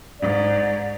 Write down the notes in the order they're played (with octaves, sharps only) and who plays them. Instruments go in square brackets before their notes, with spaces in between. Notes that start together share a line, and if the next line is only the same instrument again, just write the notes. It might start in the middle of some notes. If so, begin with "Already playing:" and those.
[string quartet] G#2 [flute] D5